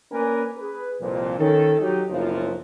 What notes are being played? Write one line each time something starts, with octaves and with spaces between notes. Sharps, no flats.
A#3 C#4 A#4 B4 D5 G#5
G#4 B4
C2 F2 A#2 F3
D#3 C#4 A4
F#3 D#4 G4
F#1 B1 F#2 F3